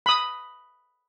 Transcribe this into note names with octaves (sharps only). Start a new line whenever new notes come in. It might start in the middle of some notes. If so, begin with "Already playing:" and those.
B5 D#6